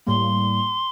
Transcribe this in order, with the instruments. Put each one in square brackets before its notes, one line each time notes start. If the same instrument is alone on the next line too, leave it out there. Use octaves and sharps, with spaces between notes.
[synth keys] A2 G3 A#3 [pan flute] C6